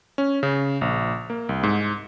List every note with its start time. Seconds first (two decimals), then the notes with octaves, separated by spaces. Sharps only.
0.18 C#4
0.43 C#3
0.81 A#1
1.30 A#3
1.49 C2
1.63 G#2